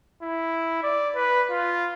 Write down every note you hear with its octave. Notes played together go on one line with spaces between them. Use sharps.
E4
D5
B4
F4